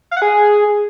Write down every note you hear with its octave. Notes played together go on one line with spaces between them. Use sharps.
F5
F#5
G#4